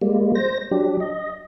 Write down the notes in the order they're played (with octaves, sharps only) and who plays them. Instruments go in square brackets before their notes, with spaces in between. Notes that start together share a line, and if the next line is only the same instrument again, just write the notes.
[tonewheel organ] G3 G#3 A#3
C5 A#6
F#3 D4 G4
D#5